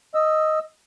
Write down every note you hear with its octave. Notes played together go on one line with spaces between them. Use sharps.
D#5 E6